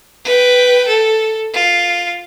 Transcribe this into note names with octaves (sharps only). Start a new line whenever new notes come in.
B4 G5
A4
F4